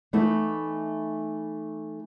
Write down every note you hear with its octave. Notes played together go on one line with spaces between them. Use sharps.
E3 A3 B3 D#4 E4